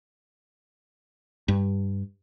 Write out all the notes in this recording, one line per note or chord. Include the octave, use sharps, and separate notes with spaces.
G2